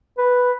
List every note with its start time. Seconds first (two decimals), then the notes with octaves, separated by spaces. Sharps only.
0.18 B4